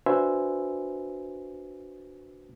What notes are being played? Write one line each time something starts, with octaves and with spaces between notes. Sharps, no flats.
D4 F#4 B4 C5 E5 G#5